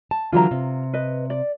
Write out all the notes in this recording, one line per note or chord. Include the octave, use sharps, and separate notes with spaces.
A5
D3 E3 F#3 F4 A#5
C3
B4 D#5
D5